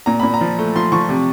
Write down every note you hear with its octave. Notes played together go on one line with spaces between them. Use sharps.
A#2 A#5
A#2 B5
A#5
F3
A3
F3 C6
F3 C#6
C3